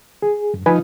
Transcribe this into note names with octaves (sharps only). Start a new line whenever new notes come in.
G#4
F#2
F3 D#4 B4 G#5 B5